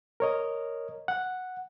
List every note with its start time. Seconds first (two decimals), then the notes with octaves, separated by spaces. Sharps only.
0.20 A#4 C#5 D#5
1.08 F#5